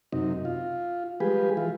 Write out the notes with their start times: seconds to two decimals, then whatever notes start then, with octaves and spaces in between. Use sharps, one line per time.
0.12 F#2 C3 D#4
0.45 F4
1.20 F3 G3 G#3 G4 G#4 B4
1.57 E3 F4